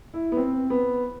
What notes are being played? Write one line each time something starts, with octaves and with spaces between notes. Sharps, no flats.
E4
B3
C4
B3